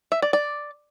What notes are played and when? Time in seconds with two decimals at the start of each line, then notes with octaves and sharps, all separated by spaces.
0.12 E5
0.22 D5
0.33 D5